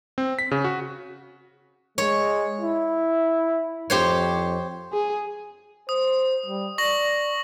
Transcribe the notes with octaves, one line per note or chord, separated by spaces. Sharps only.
C4
B6
C#3
F#4
G#3 C#5
E4
F2 G4 C5 C#5
G#4
C5 D#6
G3
D5 C#6 A#6 F#7